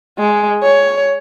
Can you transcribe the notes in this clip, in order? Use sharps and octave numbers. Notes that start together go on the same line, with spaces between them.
G#3
C#5